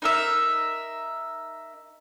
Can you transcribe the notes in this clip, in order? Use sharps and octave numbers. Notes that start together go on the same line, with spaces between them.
D#4 A#4 E5